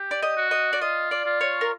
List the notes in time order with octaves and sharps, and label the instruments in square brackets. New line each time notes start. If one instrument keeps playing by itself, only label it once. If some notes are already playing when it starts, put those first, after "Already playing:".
Already playing: [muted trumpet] G4
[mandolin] D5
D#5
[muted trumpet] F#4
[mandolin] D#5
D5
[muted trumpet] F4 [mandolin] D#5
[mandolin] D5
[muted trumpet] F4
[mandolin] C#5
A#4